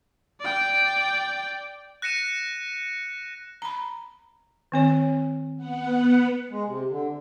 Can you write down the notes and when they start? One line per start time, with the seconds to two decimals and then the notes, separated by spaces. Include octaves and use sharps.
0.40 D5 G5
2.02 F#6 A#6 C#7 D#7 E7
3.62 A#5 B5
4.72 D#3 C4 C#5
5.56 B3 F#5
6.50 G#3
6.66 C3
6.89 D3